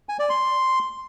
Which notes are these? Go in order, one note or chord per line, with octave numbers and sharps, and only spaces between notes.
G#5
D5
C6